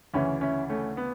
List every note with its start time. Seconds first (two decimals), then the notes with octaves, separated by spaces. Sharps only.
0.14 D2 C#3 E3 C#4 E4
0.41 C#4 E4
0.69 A3 C#4
0.97 B3